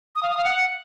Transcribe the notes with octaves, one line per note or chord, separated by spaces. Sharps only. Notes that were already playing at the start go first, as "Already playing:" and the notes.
D#6
F5
D#6
F5
F#5